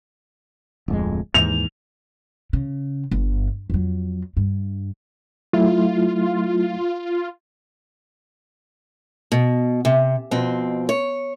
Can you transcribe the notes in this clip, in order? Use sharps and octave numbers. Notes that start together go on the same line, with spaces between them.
D1 F2 G#3
D#2 G#2 E3 F7
C#3
G1
F2 F#3
G2
F#3 A3 E4 F4
B2
C3
F2 B2 C4
C#5